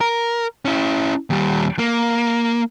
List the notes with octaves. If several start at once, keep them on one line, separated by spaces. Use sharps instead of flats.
A#4
C#4 E4
D#2 G3
A#3